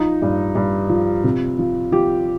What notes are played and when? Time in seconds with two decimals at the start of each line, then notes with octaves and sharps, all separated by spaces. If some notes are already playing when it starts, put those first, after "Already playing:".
Already playing: F3 D#4
0.22 G2
0.55 G2
0.89 F3
1.24 C3
1.59 F3
1.92 F3 G4